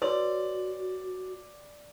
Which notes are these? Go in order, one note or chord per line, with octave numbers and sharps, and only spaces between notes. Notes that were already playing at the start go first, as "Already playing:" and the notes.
F#4 B4 C#5 D5 C6